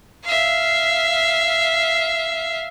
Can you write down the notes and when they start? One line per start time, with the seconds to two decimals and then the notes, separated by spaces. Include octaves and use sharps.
0.24 E5 F5